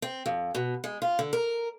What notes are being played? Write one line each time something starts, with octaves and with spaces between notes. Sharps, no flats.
C4
F2
B2
G#3
F4
D3
A#4